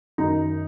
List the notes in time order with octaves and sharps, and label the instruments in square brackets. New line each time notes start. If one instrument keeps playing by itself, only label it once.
[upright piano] F#2 D#3 D#4